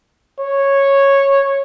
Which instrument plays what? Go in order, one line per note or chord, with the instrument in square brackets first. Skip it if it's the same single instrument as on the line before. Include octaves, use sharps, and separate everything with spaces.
[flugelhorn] C#5